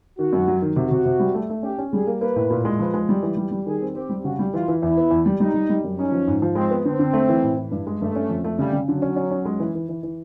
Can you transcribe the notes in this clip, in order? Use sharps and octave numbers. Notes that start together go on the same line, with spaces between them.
D#3 F#4
F#2
F#3
D#3
C3 F#4
C3
C3
G3
A3
A3
C#4 G4
C#4
G3 G#4
A#3
A#3 B4
A2
A#2
G#3
F3 B4
G#3
G3
E3
G3
G3
D#3 G#4
C4
C4 G4
G3
C#3 F#4
G3
E3 F4
E3
E2 E4
B3
E2
G3
G3 D#4
G3
G3
F#2
C#4 D#4
F3
G#2
F3
G#3 C4
B3
D3 C4
D3
A3
E3
A2
E3
G2
G#3
G2 A3
C#4
F2
A3
C#3 G3
C#3
D3 F#3
C#4
C#4
C#4
G#3
E3
E3
E3
E3